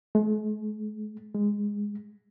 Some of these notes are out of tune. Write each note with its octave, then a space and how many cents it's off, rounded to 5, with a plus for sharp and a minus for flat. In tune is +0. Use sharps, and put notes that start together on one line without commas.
G#3 +45
G#3 -15